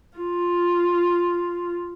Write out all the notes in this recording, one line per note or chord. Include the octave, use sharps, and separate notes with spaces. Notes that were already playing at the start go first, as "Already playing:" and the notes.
F4